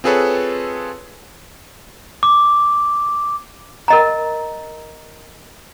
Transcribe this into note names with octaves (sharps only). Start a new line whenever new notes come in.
C4 F4 G#4 A4 B4 C#5
D6
A#4 D#5 A#5